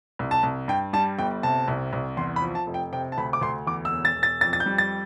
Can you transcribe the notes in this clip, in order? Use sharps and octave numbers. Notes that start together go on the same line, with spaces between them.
C2
A5
C2
G2 G5
G3 A5
G1 G5
C3 A5
C2
C2
E2 C6
B5
F3
A5
F1
G5
C3 G5
A5
D2 B5
D6
D2 C6
E2 D6
E6
E1
A6
E1
A6
F2 A6
A6
G6
G3
A6